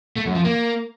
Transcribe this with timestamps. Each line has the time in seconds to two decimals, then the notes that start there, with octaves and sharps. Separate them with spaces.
0.16 A3
0.26 F#2
0.35 F3
0.44 A#3